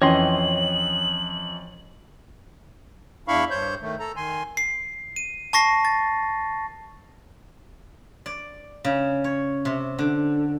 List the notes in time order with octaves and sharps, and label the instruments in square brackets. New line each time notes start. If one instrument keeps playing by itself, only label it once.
[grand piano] F2 E3 [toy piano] C#4 [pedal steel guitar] C#5 D#5 C6 [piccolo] F#7
[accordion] E2 D4 E4 F5 B5 C#6
G2 C5 C#5 G6
D#3 A3
A4 A#5
D#3 G#5 C6
[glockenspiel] C7
D#7
A5 C#6 A#6 C7
A6
[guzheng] D5
C#3
C#5
C3
D3